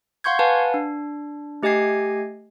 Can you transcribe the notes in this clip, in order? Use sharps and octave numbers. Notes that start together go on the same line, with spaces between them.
F5 F#5 C6 C#6 G6 G#6
B4 F5 F#5 G#5 A5
D4
A3 G4 D#5 G#5 G#6 C7